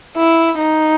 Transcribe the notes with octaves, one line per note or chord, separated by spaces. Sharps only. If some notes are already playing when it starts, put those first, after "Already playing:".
E4
D#4